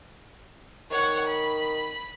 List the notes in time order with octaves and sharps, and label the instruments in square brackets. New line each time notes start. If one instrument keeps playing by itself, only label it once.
[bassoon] D#3 [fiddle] C#5 F#5
[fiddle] B5